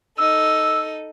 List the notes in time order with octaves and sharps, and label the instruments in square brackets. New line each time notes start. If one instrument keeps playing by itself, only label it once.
[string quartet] D#4 A4 [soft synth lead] E6